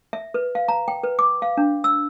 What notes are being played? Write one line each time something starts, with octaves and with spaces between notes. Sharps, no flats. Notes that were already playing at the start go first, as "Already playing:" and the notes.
E5
B4
F5
A#5
G5
B4
D6
F5
D4
E6